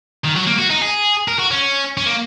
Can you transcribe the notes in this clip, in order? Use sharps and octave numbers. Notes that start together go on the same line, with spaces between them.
D#3
F#3
A#3
F#4
D#4
G#4
A#4
F#4
C#4
C#4
A#3